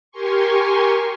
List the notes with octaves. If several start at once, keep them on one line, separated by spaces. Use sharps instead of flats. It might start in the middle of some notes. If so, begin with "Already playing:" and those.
G4 A#4 G#5 C6 C#6